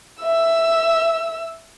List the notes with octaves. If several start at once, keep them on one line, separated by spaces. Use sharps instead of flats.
E5 E6